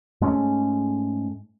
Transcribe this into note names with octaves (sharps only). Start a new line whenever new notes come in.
G#2 G#3 A3 C#4